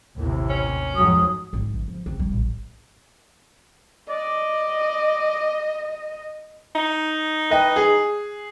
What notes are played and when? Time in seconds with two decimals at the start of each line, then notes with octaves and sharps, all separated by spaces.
0.19 A1 D#2 C3 E4
0.50 C#4
0.96 F2 G#2 F#3 D#6
1.53 G#1
1.74 E3
1.88 F3
2.06 C4
2.19 G3
2.32 A1
4.09 D5 D#5
6.75 D#4
7.50 B4 D#5 G5
7.76 G#4